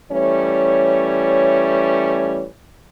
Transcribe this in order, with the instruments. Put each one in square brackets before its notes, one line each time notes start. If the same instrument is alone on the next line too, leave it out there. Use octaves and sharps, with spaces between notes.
[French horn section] E3 G3 A3 C#4 C#5